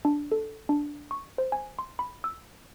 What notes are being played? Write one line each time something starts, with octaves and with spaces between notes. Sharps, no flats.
D4
A4
D4
C#6
C5
G#5
C6
B5
E6